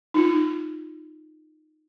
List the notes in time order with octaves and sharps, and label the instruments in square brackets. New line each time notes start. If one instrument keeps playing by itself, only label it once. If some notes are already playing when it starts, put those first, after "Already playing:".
[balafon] D#4 F4